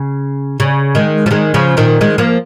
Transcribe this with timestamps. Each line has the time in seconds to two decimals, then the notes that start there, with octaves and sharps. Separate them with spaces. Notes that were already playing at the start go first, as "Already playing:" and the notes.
Already playing: C#3
0.60 C#3
0.95 D#3 G#3
1.26 F3
1.31 D#3 G#3
1.54 C#3 F3
1.77 A#2 D#3
2.01 D#3 G#3
2.18 F3 A#3